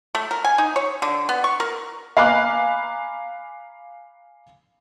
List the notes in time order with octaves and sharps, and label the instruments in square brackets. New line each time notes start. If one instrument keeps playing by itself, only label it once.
[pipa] A3
A#4
G#5
D#4
C#5
D3
B3
C#6
A#4
[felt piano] F5 G#5 A#5 B5 D6 F#6